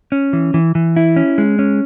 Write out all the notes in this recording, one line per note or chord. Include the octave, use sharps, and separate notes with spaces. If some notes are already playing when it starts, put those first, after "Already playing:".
C#4
E3
E3
E3
E4
C#4
G#3
C#4